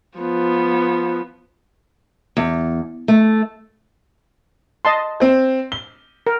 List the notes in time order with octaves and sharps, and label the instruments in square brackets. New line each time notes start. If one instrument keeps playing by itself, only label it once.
[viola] F3 B3
[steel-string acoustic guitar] E2
A3
[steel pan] D#5 A5 C6
[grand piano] C4 C5
G7
[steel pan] A#4